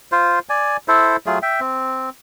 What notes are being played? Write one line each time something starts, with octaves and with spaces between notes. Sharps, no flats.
F4 C5
D5 G#5
E4 A4 C5
F#3 A3 F4 G#4
E5 G5
C4